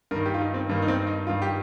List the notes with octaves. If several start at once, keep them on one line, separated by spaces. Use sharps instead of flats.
G2 D#3 A#4
G4
F4
D#4
C4
G2 D#3 A#3
D#4
C4
D#4
G2 D#3 F4
G4